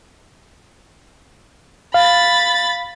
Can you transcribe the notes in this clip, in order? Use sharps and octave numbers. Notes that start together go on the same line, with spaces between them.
F5 B5 A6